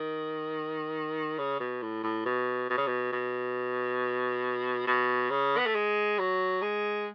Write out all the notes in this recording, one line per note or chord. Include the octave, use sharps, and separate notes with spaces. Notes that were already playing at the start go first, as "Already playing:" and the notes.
Already playing: D#3
C#3
B2
A2
A2
B2
B2
C#3
B2
B2
B2
C#3
B3
A3
G#3
F#3
G#3